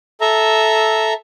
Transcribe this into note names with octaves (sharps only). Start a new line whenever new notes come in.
A4 E5 A#5